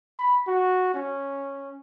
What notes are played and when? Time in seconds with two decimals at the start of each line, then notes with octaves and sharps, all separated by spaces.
0.19 B5
0.47 F#4
0.94 C#4